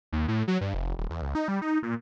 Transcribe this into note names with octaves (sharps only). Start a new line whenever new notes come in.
D#2
A2
F#3
G2
F1
D#1
E2
C#2
D#4
G3
D#4
A#2